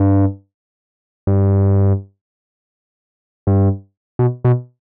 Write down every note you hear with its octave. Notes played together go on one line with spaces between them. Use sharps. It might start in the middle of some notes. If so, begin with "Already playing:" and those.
Already playing: G2
G2
G2
B2
B2